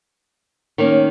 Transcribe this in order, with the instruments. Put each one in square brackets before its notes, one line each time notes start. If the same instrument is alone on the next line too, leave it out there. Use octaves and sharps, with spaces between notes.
[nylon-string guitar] D#3 A#3 C#4